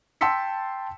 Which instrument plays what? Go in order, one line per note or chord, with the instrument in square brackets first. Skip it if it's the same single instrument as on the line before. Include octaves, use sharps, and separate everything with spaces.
[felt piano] G5 A5 C6 E6 B6 C#7